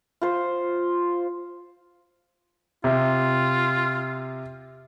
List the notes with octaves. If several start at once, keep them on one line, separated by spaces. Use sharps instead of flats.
F4 C5
C3 F4